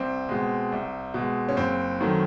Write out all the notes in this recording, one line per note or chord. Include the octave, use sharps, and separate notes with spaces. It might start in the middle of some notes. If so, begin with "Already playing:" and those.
Already playing: C2 C4
B2 G#3
C2
B2 G#3
C#4
F#1 C4
F#2 D#3 F#3 A3